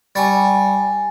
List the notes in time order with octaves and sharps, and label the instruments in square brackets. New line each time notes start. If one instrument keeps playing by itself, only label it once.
[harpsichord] G3 C#6 [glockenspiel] G#5 A6